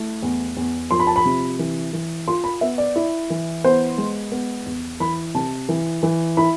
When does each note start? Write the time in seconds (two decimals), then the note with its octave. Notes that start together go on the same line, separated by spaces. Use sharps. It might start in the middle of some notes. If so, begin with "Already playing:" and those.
Already playing: A3 E4
0.23 E2
0.57 E2
0.91 F3 C6
1.00 B5
1.07 A5
1.16 B5
1.25 C3
1.59 E3
1.93 E3
2.28 F4 C6
2.44 B5
2.61 B3 E5
2.78 D5
2.96 E4
3.30 E3
3.64 B3 C5
3.98 G#3
4.32 B3
4.66 E2
5.00 E3 B5
5.35 C3 A5
5.69 E3
6.03 E3
6.37 E4 B5